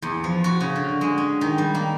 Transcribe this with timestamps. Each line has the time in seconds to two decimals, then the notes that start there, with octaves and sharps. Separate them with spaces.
0.02 E2
0.24 F3
0.44 F#4
0.61 C#3
0.76 D3
1.01 G#3
1.18 C#4
1.41 D#3
1.58 G3
1.75 A#3